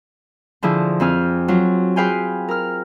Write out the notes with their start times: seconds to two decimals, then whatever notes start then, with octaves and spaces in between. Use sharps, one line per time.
0.62 D3 F3 E4 G#4
1.00 F2 C4 G#5 F6
1.48 F#3 F4
1.96 G#4 B4 C5 F5 G5 G#5
2.48 A#4 F6